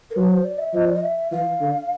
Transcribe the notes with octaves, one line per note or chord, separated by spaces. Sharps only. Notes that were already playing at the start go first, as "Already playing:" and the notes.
A#4
F#3 B4
C5
D5
E5
F3 D#5
D5
D#5
E5
E3 F5
D3